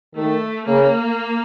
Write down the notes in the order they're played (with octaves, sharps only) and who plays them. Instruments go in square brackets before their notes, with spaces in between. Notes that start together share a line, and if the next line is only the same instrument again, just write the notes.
[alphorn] D#3 [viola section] A3
[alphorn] C#3 [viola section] A#3